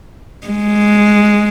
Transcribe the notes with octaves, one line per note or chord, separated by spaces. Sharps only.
G#3